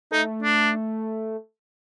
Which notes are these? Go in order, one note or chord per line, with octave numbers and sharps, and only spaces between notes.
A3 D#4
D4